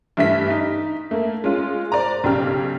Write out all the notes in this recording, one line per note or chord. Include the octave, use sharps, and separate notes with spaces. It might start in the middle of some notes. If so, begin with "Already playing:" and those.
G2 E3 A3 E5 B6
D#4
A3 A#3
G#3 C#4 F4
C5 D5 A#5
B1 C#3 G4 F6